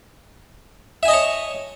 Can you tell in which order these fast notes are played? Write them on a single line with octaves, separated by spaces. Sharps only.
E5 G#5 D#5 A5 C#5